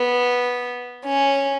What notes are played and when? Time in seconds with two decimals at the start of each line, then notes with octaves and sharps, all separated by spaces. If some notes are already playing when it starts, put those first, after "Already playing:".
Already playing: B3
1.05 C#4